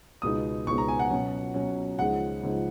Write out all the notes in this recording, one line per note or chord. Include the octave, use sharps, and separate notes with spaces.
C#2 B2 G#3 B3 D#4 D#6
C#2 B2 G#3 B3 D#4 C#6
A#5
G#5
F#5
B2 F#3 C#4
B2 F#3 C#4
C#2 C#3 F3 G#3 D#4 F#5
C#2 C#3 F3 G#3 D#4